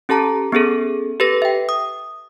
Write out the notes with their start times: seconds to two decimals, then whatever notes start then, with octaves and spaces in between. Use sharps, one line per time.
0.09 C#4 G4 A4 A5 A#5
0.52 B3 C#4 G#4 A4
1.20 G4 A4 B4 A#6
1.42 E5 G5
1.69 D#6